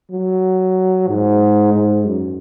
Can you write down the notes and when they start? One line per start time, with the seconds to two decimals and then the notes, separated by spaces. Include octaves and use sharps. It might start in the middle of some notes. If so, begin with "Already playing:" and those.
0.11 F#3
1.08 G#2
1.73 G#2
2.06 F#2